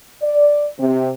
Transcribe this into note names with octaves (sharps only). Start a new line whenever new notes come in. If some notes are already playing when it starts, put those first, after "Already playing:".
D5
C3